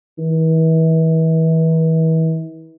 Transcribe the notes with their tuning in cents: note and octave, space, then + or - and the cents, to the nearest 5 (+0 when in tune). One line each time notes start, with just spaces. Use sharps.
E3 -35